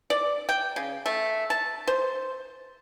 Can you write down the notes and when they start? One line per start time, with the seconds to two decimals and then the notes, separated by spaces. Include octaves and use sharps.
0.10 D5
0.49 G5
0.76 C#3
1.06 A3
1.50 A5
1.87 C5